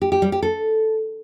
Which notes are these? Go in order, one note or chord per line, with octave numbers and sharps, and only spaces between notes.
G4
G4
G3
G4
A4